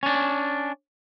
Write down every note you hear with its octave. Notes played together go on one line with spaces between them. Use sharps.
C#4 D4